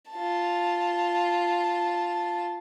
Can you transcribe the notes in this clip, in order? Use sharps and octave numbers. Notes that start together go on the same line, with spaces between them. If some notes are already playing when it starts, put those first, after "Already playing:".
F4 A5